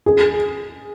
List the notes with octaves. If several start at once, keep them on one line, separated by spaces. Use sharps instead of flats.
G#4